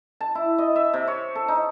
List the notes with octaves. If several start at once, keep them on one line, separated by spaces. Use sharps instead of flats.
A5
E4
D#5
E5
C3
C#5
A4
D#4